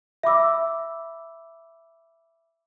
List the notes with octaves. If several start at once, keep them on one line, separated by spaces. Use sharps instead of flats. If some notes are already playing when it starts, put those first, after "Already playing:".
E5 B5 D6 E6